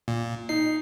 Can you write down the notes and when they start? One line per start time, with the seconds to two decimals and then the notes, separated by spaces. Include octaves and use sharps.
0.08 A#2
0.49 D#4 C7